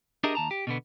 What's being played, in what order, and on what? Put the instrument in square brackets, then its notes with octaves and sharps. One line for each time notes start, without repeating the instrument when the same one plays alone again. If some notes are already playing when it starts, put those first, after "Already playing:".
[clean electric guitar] D4 G4 G#4 A#4 D#5 E5
D#2 A5 A#5
G4
B2 D3 B3